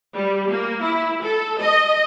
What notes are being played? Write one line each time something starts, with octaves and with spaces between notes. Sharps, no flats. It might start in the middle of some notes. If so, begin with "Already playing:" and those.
G3
A#3
E4
A4
D#5